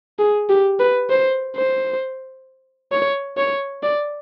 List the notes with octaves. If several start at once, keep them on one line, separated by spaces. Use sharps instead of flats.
G#4
G4
B4
C5
C5
C#5
C#5
D5